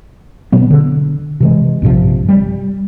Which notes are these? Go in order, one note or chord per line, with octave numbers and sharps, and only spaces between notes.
B2 F#3 B3
D3
C3 E3 G#3
A#1 G2 C3 F3
G3